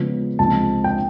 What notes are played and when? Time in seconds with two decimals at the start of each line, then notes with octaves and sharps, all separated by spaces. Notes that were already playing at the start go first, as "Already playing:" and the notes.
Already playing: C#3 F3 G#3 B3
0.39 C#2 C3 F3 G#3 C4 A5
0.84 G5